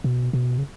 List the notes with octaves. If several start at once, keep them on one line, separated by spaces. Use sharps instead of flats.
B2
B2
C#3